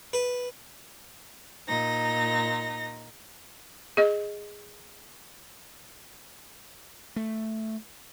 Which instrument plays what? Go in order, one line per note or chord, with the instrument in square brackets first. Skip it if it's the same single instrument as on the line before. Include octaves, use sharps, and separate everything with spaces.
[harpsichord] B4
[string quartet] A#2 D#4 A#6
[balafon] G#4 D#5
[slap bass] A3